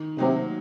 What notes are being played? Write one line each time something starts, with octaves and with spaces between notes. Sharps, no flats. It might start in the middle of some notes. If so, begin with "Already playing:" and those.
Already playing: D#3
C3 F#3 A#3 D#4